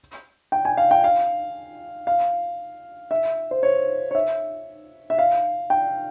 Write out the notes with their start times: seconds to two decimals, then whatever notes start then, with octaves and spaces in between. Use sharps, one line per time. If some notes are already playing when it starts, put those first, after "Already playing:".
0.52 G5
0.65 G#5
0.77 F5
0.91 G5
1.04 F5
2.07 F5
3.11 E5
3.51 C5
3.63 C#5
4.11 C#5
4.15 E5
5.10 E5
5.18 F5
5.70 G5